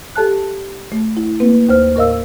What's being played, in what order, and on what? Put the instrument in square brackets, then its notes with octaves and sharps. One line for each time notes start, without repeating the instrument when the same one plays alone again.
[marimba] G4 A4 A5 F#6
A3
E4
A#3 C4 B4
D#2 C5 F6
A2 A#4 D#5 F5 E6